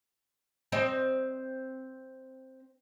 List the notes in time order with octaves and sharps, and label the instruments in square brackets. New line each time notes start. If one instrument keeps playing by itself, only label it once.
[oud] C4 C5 D#5